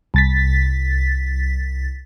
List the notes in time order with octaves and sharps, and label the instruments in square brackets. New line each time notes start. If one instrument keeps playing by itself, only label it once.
[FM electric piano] C2 A6 B6